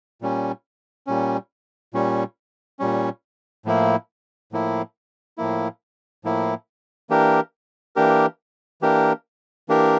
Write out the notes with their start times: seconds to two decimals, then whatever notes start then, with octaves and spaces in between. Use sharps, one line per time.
0.21 A#2 G3 C#4
1.07 A#2 G3 C#4
1.94 A#2 G3 C#4
2.79 A#2 G3 C#4
3.65 A2 F3 A#3 E4
4.52 A2 F3 A#3 E4
5.38 A2 F3 A#3 E4
6.24 A2 F3 A#3 E4
7.10 E3 A#3 D4 G4 A#4
7.96 E3 A#3 D4 G4 A#4
8.82 E3 A#3 D4 G4 A#4
9.69 E3 A#3 D4 G4 A#4